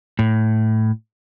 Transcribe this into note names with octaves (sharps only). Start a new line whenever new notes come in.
A2